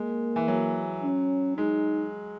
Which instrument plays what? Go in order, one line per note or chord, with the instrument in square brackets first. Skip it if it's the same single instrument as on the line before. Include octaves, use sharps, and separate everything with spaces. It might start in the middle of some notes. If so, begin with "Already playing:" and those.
Already playing: [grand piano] G#3 [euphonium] A#3
[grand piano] E3
F#3
[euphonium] C#4
[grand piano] G#3 [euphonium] D#4